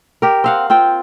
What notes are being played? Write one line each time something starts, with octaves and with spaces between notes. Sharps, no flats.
G4 A#4
C4 F5 F#5
C4 F4 G5